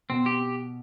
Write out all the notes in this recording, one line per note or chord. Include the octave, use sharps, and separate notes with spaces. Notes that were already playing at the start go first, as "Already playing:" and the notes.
B2 C4
G4